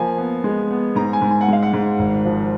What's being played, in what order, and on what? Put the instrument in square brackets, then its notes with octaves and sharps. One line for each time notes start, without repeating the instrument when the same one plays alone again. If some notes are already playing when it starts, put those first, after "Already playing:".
Already playing: [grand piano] F3 A#3 G#5
B3
G#3
B3
G#2 A#5
G#5
G#2
G#5
F#5
G#3 F5
F#5
G#2
G#1
F3